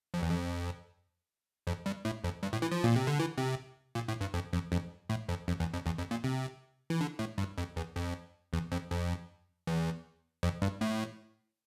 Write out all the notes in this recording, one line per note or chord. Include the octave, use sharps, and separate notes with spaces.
F2
E2
F2
F2
G2
A2
F2
G2
A2
E3
F3
A#2
C3
D3
E3
C3
A#2
A2
G2
F2
F2
F2
A2
F2
F2
E2
F2
E2
F2
A#2
C3
E3
D3
A2
G2
F2
E2
F2
E2
F2
F2
E2
F2
G2
A2